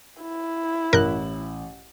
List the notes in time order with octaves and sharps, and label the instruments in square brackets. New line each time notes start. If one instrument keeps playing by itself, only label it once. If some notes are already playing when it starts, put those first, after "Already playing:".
[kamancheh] E4
[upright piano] A1 F#7 [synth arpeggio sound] A#4 F#6